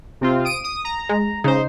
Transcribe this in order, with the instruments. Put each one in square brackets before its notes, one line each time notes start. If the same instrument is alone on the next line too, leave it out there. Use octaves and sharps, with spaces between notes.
[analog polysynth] C3 C4 F4
D#6 D7 D#7
D#6
A#5
[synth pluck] G#3
[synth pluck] C#3 [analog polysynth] D#4 C5